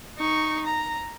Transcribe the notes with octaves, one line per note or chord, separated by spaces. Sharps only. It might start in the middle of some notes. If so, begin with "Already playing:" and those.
D#4 C#6
A#5